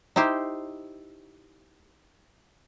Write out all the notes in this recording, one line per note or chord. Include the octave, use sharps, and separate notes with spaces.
D#4 E4 G4 C5